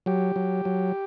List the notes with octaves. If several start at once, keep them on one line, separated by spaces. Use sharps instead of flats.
F#3 G4
F#3
F#3